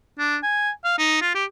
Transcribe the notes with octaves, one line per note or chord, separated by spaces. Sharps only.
D4
G#5
F5
D#4
F4
G4